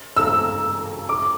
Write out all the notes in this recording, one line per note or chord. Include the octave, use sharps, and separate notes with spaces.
E6
D6